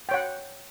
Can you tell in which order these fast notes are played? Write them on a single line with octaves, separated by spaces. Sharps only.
G5 C#5 F#5